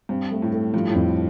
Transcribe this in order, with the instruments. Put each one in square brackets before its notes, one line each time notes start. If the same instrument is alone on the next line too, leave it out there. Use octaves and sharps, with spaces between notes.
[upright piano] G2 [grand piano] C4
[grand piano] A3
[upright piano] A2
[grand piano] A3
[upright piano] G2 [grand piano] F3
[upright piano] A2
[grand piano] F2